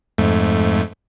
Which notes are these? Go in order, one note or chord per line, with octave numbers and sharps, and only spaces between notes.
F2 G#2 A3